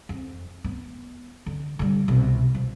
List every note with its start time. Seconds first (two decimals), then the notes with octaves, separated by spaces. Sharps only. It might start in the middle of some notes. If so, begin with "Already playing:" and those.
0.09 F2
0.64 B3
1.46 D3
1.79 D3 G3
2.08 C2 B2
2.55 F3